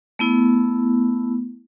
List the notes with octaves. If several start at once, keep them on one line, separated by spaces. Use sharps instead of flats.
A3 B3 E4